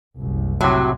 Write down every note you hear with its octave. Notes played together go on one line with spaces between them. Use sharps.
F#1 C2
A2 C3 F#3